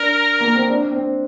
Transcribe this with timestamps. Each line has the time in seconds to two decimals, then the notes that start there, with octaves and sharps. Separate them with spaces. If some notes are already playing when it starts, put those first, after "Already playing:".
Already playing: D4 A#4
0.41 A#3
0.55 C4
0.69 D4
0.91 C4